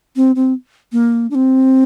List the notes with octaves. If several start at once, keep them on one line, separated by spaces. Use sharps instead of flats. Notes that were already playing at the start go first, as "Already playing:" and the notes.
C4
C4
A#3
D4
C4